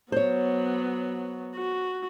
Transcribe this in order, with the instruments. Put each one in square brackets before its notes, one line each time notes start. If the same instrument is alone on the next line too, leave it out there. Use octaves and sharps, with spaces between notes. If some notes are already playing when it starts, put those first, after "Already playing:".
[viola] F#3 B3 [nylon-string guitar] C5 C#5
[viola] F#4